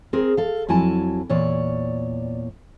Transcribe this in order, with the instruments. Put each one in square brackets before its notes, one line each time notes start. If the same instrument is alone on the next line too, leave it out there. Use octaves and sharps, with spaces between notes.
[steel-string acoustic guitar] C4 G#4 A#4
A4 F5
F2 F#3 E4 G#5 A5
E2 A#2 C#5 D5